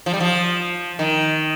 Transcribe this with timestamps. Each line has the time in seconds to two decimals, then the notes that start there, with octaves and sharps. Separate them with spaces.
0.06 F3
0.13 G3
0.20 F3
0.99 D#3